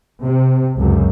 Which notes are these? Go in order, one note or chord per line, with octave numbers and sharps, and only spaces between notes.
C3
C#2 F#2